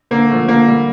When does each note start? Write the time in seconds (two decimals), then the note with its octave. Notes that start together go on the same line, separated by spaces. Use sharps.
0.11 D3 A#3
0.30 F3 A3
0.48 D3 A#3
0.67 G3